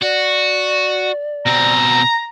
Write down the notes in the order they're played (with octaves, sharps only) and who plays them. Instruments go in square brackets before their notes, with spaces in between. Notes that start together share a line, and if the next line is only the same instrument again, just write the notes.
[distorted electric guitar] F#4 [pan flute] D5
[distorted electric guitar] B2 C4 [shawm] A#5